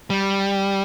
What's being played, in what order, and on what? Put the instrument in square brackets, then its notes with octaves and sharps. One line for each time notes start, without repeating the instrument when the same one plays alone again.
[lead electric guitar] G3